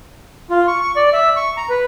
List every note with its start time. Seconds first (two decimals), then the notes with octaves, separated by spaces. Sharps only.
0.50 F4
0.68 C#6
0.81 C#6
0.96 D5
1.13 E5
1.36 C#6
1.57 A#5
1.70 B4